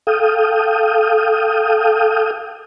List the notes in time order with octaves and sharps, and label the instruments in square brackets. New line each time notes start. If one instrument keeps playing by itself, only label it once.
[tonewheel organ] A4 F5 G5 D#6